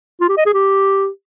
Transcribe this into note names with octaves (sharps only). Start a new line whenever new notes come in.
F4
G4
D#5
G#4
G4